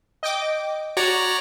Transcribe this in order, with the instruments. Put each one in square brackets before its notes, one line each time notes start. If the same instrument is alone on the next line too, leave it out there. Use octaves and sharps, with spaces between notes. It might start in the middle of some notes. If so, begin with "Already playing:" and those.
[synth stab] D#5 G5 D6
[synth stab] F#4 [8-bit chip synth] C#5 D5 A#5